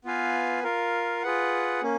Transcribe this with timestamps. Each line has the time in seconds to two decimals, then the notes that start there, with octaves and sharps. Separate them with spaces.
0.05 B3 F4 B4 F5 G#5
0.63 F4 A#4 F5
1.23 F4 G#4 B4 F#5
1.82 A#3 C#4